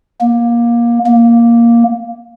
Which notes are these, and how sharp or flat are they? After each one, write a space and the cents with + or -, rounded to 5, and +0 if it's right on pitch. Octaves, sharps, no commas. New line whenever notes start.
A#3 +20
A#3 +5